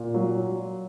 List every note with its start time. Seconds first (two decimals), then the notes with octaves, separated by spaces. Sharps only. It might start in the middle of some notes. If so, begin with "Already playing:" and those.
Already playing: A#2
0.14 F#3